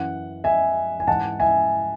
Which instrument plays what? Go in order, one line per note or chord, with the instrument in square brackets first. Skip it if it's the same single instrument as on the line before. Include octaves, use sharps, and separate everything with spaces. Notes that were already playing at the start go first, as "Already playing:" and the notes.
Already playing: [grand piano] F#2 E3 F#5
E5 G#5
G#5
G#2 E3 F#5 A5
E5 G#5